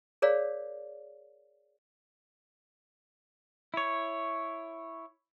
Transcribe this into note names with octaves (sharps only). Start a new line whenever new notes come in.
G#4 A#4 C#5 D5 F5
E4 C#5